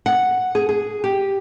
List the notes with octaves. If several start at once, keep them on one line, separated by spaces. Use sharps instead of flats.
F#5
G#4
G#4
G4